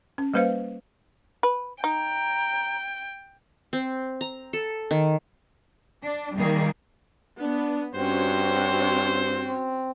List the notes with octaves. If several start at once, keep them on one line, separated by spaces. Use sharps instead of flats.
C#4
G3 A#3 B4 C5 F5
B4
D#4 G5 A#5
C4
A#5
A4
D#3
D4
D#3 G3 A#3 G#4
B3 D4
G2 C4 C#4 F#4 C5 C#5